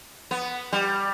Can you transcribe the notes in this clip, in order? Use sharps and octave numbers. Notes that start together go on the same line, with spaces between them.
B3
G3